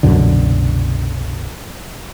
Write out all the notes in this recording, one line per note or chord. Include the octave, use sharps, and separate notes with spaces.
C2 F#2 B2 D3